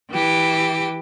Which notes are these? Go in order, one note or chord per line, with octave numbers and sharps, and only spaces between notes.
E3 G4